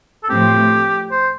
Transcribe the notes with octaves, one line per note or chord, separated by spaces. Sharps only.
A4
A2 F3 A3 C4 G4
C5